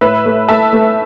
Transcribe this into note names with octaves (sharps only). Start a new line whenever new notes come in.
A2 B4 E5
A3
A3 E5 A5
A3